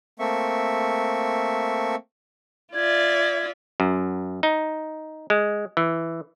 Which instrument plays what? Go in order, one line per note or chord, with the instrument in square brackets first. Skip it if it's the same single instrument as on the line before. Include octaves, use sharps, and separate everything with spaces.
[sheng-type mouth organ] A3 A#3 C4 E5 C#6
[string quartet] F4 D5 E5 [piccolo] G#6
[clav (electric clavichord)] F#2
D#4
G#3
E3